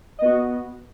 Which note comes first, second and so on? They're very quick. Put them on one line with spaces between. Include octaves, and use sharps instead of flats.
D#5 B3 F#4